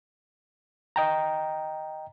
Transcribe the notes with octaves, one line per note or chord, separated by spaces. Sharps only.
D#5 G5 A#5